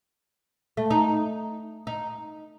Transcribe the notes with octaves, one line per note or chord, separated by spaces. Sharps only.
A3
D#4
D#4